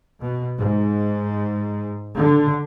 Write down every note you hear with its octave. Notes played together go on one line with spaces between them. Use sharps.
B2
G#2
D3